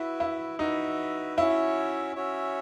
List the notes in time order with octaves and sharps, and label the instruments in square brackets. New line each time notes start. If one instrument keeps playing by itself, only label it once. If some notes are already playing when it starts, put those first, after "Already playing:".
Already playing: [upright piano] E4 [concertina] F#4 B4 E5
[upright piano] E4
[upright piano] D#4 [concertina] F#4 B4 E5
[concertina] C#4 F#4 C#5 E5 [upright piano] E4
[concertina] C#4 F#4 C#5 E5